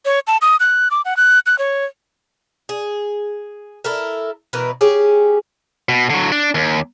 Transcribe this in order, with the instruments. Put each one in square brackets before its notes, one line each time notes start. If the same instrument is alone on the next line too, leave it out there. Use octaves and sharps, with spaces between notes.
[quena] C#5
A5
D#6
F#6
D6
F#5
F#6
F#6
C#5
[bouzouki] G#4
E4 A4 A#4
B2 E3 A#4 B4
C#4 G4 G#4
[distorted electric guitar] B2
D3 F#3
D4
D#2